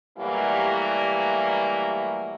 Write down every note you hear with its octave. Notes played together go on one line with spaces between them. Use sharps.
B2 E3 F#3 G3 A3 A#3